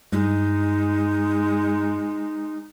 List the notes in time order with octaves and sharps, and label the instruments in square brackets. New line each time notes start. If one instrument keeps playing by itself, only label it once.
[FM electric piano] G2 [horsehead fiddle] G#3 [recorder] D#4